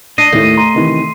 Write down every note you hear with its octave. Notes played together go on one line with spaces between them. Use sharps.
D4 D#5 C7 D#7
D#2 A2 A3
A#5 C6
C3 D#3 E3